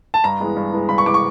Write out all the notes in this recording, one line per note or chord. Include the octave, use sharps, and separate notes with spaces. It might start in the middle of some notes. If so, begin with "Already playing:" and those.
A5
G2 A#5
E3 G#3 B3
G2
E3 G#3 B3
G2 B5
C#6
E3 G#3 B3 D6
C#6